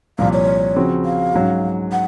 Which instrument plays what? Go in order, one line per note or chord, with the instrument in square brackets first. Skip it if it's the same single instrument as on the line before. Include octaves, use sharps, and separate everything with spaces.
[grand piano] C2 A#2 F3 [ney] F5
[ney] C#5
[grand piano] C#3 F3 C4 F#4
[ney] F5
[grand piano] G#2 F#3 C#4
[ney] F#5